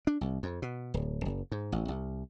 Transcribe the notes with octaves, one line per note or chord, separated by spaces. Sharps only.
D4
C2
F2
B2
D1
F#1
G#2
A1
C2